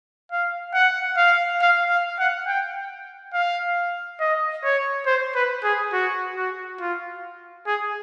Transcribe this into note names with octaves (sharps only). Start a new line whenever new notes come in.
F5
F#5
F5
F5
F5
F#5
G5
F5
D#5
C#5
C5
B4
G#4
F#4
F#4
F4
G#4